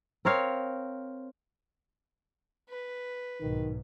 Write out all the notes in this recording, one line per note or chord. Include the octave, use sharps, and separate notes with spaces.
C4 A#4 C#5 F5
B4
B1 G#2 D#3